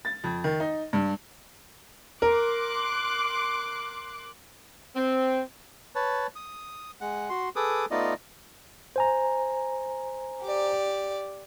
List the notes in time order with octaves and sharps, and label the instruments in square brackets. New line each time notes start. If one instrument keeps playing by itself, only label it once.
[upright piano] A6
F2
D#3
D#4
G2
[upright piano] A#4 [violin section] C6 D6 F#6
[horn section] C4
[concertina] B4 C#5 A5
D#6
G#3 F#5
F#4 C6
G#4 A4 B4 D6 D#6
A3 B3 D#4 F4 D5 D#5
[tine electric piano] C5 G#5 A#5
[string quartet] G4 D5